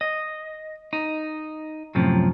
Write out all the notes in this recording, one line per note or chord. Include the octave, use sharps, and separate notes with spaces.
D#5
D#4
F#2 A2 C3 F3